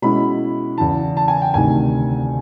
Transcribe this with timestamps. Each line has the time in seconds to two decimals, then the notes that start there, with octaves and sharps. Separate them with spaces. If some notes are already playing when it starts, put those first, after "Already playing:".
0.02 B2 G#3 C#4 E4 B5
0.78 E2 C#3 E3 A5
1.17 A5
1.28 G#5
1.42 G5
1.54 D2 C3 D#3 G#5